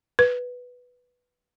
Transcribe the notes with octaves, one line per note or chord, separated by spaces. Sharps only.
B4